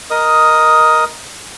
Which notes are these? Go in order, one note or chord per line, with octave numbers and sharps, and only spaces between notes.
A#4 D#5 D#6